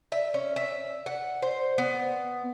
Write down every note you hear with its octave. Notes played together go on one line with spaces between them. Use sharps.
E5
C#4
E5
F#5
C5
B3